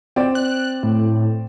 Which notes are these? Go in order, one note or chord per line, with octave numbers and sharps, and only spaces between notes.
C4 D5
F#6
A2